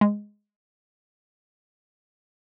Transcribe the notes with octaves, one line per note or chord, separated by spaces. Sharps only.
G#3